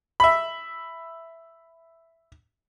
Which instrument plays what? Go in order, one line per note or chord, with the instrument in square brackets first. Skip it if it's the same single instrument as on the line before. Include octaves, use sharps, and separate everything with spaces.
[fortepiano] E5 B5